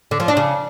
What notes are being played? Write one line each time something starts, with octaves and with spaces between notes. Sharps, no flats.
D3
F3
D4
C#3